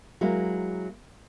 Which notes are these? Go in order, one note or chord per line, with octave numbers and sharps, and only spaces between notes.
F#3 G#3 A#3 E4